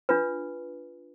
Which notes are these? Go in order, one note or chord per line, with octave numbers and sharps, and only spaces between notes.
D4 F4 B4